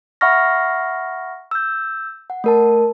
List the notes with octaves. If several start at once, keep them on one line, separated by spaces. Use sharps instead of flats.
E5 F#5 B5 C#6 F6 A#6
E6 G6
F#5
A3 A#4 A5